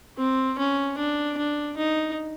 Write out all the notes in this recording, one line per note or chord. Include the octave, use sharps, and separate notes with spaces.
C4
C#4
D4
D4
D#4